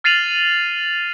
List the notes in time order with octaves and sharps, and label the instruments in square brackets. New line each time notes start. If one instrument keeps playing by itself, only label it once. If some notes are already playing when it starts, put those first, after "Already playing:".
[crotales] F6 A6 C7 D#7 F7 F#7